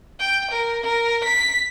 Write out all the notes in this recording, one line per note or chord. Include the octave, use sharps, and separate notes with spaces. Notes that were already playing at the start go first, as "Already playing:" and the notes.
G5
A#4
A#4
B6